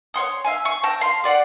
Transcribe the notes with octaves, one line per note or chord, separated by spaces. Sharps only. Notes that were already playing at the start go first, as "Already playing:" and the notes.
C#5 F#5 C6 D#6
E5 F5 G#5
C#6
G5 A5 A#5 E6
F5 C6
G4 D5 F#5